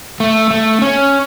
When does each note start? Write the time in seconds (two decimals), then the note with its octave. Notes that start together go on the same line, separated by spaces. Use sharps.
0.20 A3
0.51 A3
0.82 C#4